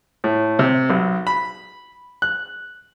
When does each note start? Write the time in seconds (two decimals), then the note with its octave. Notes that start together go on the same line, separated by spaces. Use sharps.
0.24 A2
0.59 C3
0.90 B1
1.27 B5
2.22 F#6